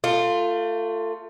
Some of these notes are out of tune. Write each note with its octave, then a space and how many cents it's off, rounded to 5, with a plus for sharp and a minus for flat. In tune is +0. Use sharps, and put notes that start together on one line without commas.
A3 +25 F4 +0